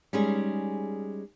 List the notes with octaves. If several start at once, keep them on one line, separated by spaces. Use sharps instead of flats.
G3 G#3 C#4 D#4 G#4